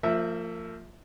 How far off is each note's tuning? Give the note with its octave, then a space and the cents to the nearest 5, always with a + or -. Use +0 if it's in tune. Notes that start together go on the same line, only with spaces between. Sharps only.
F3 +0 A#3 -40 E5 +0